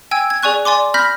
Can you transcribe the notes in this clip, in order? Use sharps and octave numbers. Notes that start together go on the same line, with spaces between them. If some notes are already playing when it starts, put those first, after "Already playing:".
G5 G#5 E6 G#6
G#6
G#4 D5 G#5 C#6 F#6
D5 G#5 C6 D6
B5 F6 G6 A#6 B6